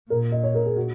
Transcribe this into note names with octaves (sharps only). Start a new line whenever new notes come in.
A#2 A#4
D#5
C#5
A#4
G#4
F#4